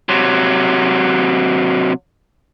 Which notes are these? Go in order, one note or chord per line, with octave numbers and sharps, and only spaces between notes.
C3 F#3